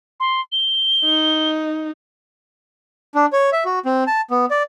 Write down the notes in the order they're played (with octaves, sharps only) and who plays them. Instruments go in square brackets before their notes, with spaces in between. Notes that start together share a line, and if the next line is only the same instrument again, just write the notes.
[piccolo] C6
G7
[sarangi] D#4
[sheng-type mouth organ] D4
C#5
E5
F#4
C4
A5
B3
D5